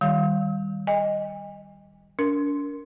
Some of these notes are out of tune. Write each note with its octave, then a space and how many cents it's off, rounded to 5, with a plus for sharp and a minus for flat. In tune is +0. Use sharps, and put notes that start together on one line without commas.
D#3 +0 G3 +0 F5 +0
D#5 +0 G#5 -40
D4 -40 A#4 +0